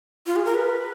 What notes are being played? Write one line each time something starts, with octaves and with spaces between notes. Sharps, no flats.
F4
G#4
A#4
B4